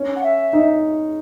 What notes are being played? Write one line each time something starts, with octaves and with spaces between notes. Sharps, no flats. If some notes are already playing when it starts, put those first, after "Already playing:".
Already playing: C#4
F#5
E5
D#4